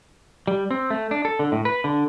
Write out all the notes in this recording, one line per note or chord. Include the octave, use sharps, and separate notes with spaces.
G3
C4
A3
D4
A4
D3
A2
B4
D3